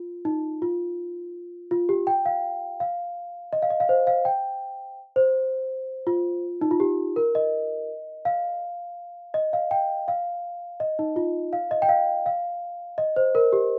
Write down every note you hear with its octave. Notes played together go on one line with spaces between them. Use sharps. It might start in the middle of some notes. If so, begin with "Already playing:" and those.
Already playing: F4
D#4
F4
F4
G4
G5
F5
F5
D#5
F5
D#5
F5
C5
F5
G5
C5
F4
D#4
F4
G4
A#4
D#5
F5
D#5
F5
G5
F5
D#5
D#4
F4
F5
D#5
G5
F5
F5
D#5
C5
A#4
G4